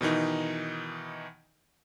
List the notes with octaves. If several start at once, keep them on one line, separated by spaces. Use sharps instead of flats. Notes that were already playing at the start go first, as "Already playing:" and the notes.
B2 D#3 E3 D#4